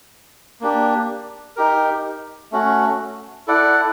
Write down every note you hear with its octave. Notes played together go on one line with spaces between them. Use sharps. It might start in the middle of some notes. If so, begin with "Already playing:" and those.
A#3 D4 G4
D#4 G4 A#4
A3 C#4 F#4
E4 A4 D5 F#5